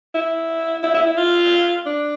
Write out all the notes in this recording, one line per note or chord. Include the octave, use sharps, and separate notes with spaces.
E4
E4
E4
E4
F4
D4